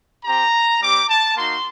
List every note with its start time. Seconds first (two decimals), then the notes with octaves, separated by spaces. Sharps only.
0.24 C4 G4 A#5
0.81 G3 C4 G4 D6
1.09 A5
1.36 A#3 D#4 F#4 C6